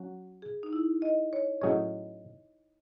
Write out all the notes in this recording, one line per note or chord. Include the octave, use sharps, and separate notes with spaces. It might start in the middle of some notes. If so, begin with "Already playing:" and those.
Already playing: F#3 C#4 F#4
G#4
D#4
E4
D#5
C#5
A2 F#3 C#4 G#4 C#5 D#5